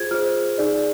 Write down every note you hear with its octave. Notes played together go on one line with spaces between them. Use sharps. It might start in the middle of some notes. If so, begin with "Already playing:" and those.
Already playing: F4 G#4 C5 G#6
F4 G#4 C5 F6
D#4 G#4 D5